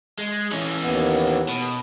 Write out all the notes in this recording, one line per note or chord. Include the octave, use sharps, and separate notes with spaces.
G#3
E3 C#4
D#2 B3
B2